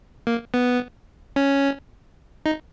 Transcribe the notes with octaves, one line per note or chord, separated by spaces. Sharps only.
A#3
B3
C#4
D#4